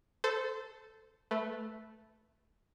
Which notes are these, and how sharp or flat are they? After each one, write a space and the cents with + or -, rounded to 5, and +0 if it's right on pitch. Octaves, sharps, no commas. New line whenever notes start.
A4 +0 C5 -20
A3 -5 B4 +0